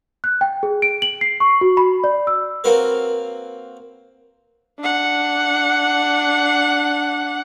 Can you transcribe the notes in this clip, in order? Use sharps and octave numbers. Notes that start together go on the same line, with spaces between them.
F#6
G5
G#4
D7
F#7
C7
C#6
F#4
B5
D5
E6
A#3 C4 F#4 A#4 B4
D4 F#5